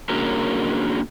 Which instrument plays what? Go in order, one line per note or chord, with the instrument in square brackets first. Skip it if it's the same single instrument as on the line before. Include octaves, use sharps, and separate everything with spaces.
[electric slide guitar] A#3 C#4 D4 F#4 G#4 A#4